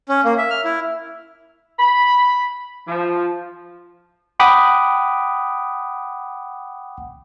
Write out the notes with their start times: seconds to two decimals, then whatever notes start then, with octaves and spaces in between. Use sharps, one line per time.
0.09 C#4
0.24 A#3
0.38 E5
0.50 F6
0.64 E4
1.79 B5
2.87 F3
4.40 F#5 G5 B5 D6 D#6